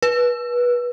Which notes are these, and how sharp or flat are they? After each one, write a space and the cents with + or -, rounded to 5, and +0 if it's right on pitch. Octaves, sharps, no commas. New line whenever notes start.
B4 -25